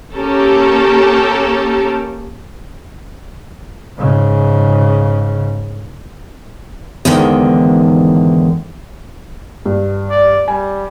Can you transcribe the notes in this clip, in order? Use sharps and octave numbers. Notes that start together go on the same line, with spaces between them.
A#3 C#4 G4 A4 A#4
G#2 C#3
E2 G#2 D3 D#3
G2
D5
G3 G#5